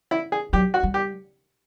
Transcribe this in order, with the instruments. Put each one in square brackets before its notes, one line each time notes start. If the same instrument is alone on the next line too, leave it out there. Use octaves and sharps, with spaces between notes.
[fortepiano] E4
G#4
[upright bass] F#3 [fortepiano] G4
[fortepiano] F#4
[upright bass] G3
[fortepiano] G4